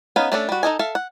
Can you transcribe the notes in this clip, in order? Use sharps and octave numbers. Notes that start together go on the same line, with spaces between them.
B3 C#4 D#4 B4 F5
A3 C#4 D4 A4
G3 F#4
D#4 A4 D#5 G#5
A4 E5 F5
F#5